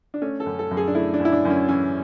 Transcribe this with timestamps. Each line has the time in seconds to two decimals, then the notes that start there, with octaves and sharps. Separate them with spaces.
0.14 D4
0.22 A3 C#4
0.40 A4
0.46 F#2
0.59 A4
0.71 F#2
0.77 G#4
0.88 D4
0.95 A3 E4
1.14 D4
1.20 F#2
1.25 E4
1.32 D4
1.45 F#2
1.50 C#4
1.68 E3 C#4